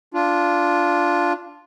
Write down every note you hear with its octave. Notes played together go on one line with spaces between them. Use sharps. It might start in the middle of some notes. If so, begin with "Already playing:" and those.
D4 F4